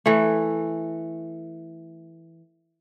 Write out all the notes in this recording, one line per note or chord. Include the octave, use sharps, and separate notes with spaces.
E3 A3